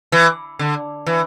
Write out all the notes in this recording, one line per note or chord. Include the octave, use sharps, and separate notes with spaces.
E3
D3
E3